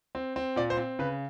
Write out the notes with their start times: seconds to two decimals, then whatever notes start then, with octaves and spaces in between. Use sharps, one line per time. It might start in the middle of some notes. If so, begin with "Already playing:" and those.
0.15 C4
0.36 C4
0.56 A#2 D5
0.70 C5
0.77 C4
0.99 C#3 B4